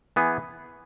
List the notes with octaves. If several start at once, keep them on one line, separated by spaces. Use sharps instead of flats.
E3 B3 G#4